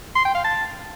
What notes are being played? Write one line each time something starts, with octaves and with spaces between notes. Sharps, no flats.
C6
G5
F5
A5